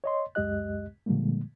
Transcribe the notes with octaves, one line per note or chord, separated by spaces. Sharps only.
C#5 D#5 C6
C#2 F#2 G#3 G4 D#5 F#6
A#2 D3 F3 G3 G#3 A#3